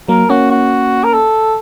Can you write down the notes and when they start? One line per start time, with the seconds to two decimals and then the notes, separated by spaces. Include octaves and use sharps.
0.08 F#3 A#3 A#4
0.30 A#3 C#4 F#4
0.51 F#4
1.04 A#4
1.14 A4